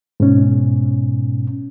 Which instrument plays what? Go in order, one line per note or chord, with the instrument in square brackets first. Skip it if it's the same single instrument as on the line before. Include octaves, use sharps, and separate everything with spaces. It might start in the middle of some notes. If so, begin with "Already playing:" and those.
[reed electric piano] G#2 B2 C#4